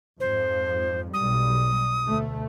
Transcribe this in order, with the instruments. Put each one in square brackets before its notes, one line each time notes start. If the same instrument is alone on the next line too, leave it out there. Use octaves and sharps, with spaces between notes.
[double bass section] F2 G#2 F3 [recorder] C5
[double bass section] B1 G3 [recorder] D#6
[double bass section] D2 B2 A3